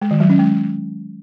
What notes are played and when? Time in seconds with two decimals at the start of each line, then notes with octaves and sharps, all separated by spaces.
0.02 G#3
0.11 D#3
0.20 F#3
0.29 C#4
0.39 G#3